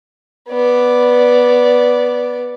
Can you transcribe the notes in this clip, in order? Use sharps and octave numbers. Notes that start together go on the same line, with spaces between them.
B3 D5